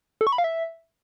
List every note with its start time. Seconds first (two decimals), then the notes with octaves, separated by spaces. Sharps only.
0.21 A4
0.27 C#6
0.33 B5
0.38 F5
0.44 E5